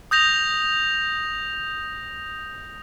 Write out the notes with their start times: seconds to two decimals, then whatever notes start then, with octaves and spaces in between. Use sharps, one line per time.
0.11 D#6 G6 A#6 F7